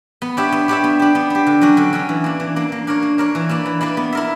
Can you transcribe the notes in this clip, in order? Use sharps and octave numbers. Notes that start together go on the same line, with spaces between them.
B3
D4 G4 C#5 E5
B3
D4 G4 C#5 E5
B3
D4 G4
B3
D4 G4
D3
F#3 C#4 F#4
D3
F#3 C#4 F#4
E3
A#3 D4
E3
A#3 D4
A#3
D4 A#4 C#5
A#3
D4 A#4 C#5
E3
A#3 E4 B4 D5
E3
A#3 E4 B4 D5
B3
E4 A#4 E5